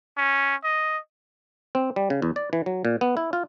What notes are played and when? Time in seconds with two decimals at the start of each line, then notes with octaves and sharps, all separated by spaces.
0.17 C#4
0.64 D#5
1.75 C4
1.96 G3
2.10 C#3
2.22 E2
2.36 D5
2.53 E3
2.66 F#3
2.85 A#2
3.01 B3
3.17 E4
3.33 F4